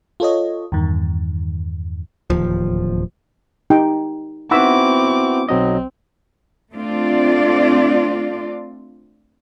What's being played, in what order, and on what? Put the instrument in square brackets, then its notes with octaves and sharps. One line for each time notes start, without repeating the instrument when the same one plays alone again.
[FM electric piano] F4 A4 C#5 D#5
E2 G2 D#3
[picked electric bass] D1 D#2 F3
[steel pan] D#4 G4 G5
[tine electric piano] B3 E4 F#4 [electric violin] C4 D6 [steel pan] D#4 B5 E6
[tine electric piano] B1 F#3 D#5 [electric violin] C4
[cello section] A3 C4 D4 F4 D5